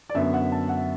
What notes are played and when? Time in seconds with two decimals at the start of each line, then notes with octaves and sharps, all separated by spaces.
0.09 D5
0.14 F#2 D3 B3 E5
0.34 F#5
0.52 A5
0.69 F#5